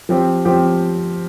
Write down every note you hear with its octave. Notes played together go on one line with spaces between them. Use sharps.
F3 C4 G4
F3 C4 G4